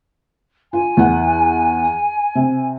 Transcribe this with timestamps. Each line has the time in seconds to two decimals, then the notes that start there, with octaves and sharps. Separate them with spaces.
0.73 F4 G#5
0.97 E2 F#5
2.35 C3